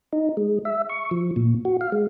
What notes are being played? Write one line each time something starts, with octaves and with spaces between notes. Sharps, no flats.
D#4
G#3
E5
C#6
F3
A#2
F#4
F5
G#3